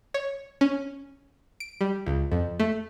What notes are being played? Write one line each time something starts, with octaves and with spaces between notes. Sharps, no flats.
C#5
C#4
D7
G3
C#2
F2
A3